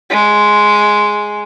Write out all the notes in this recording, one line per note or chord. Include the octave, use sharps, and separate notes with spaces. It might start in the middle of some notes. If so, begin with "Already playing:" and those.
G#3